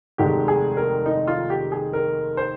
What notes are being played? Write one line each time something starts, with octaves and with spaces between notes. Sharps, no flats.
F1 D#2 D#3 G#3 G4
G#4
A#4
D#4
F4
G4
G#4
A#4
C5